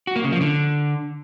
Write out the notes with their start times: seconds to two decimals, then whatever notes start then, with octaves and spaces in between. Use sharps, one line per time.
0.07 F#4
0.16 A#3
0.24 C#3
0.32 F3
0.41 D3